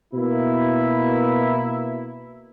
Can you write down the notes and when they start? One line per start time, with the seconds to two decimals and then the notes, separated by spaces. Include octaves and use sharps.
0.13 B2 A#3 E4